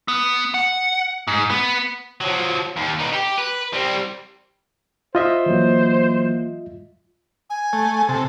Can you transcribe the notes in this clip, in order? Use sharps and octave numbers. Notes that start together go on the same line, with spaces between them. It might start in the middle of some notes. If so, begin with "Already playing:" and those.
B3
F#5
G#2
B3
F3 F#3
D#2
D#4 B4
G4
B4
G3 C4
F4 C5 D#5 E5
E3 F#3 A#3
G#5
A3
C3 A4